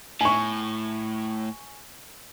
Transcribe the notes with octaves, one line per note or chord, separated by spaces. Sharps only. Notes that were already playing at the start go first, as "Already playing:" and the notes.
A2 G#5 C#6